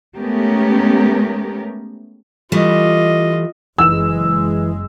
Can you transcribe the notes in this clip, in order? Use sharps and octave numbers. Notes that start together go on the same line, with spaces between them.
G#3 A3 B3 C#4 G4 A#4
E3 G3 A3 F4 D#5
F#1 E3 G#3 E6 E7